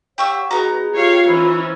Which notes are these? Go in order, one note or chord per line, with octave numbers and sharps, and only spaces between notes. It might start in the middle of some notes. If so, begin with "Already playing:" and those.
G4 C#5 F5 F#5 C#6 E6
B3 D#4 F#4 G#4 A#5
F4 G4 C#5 F5
E3 C#4 C5 B5 E6